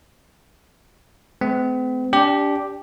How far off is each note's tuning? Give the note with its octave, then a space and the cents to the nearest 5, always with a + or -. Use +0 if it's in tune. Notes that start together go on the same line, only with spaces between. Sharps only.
A3 -40 C4 -45
D4 -30 G4 +0 D5 +0